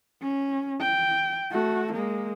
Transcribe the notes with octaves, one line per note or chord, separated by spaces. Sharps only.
C#4
G5
A3 F#4
G#3 A#3